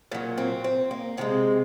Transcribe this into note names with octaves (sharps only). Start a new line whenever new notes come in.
A#2 F#3
C4
C4
A#3
C3 F3 G#3 C4